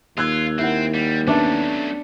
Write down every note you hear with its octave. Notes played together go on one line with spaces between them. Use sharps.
D#2 F4 E6 F#6 G#6
C4 E4 A#4 F#5
G3
F#3 A3 B3 C#4 D4 E5